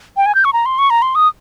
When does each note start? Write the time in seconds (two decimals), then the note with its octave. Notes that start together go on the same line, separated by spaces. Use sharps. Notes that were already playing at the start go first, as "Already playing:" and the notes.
0.17 G5
0.26 G#5
0.35 G6
0.45 C#6
0.53 A#5
0.66 C6
0.79 C#6
0.90 A#5
1.02 C6
1.15 D#6